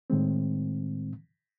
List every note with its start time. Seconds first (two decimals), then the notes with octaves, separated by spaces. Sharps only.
0.10 A2 D#3 G#3 C4